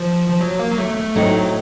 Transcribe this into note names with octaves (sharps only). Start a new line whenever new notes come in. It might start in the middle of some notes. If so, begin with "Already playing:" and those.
Already playing: F3
F3
F#3
A#3
F#3
A3
A3
A2 F#3 A3 C4 D#4